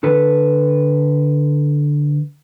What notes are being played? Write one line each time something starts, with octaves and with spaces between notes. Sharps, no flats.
D3 A4 B4